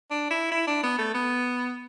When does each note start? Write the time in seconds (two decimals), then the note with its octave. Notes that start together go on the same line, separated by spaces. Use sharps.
0.11 D4
0.30 E4
0.52 E4
0.67 D4
0.83 B3
0.98 A3
1.14 B3